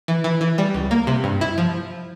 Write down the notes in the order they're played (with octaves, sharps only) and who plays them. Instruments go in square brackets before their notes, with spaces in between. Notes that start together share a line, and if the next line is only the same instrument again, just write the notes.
[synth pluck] E3
E3
E3
G3
C#2
A#3
C3
G2
E4
F3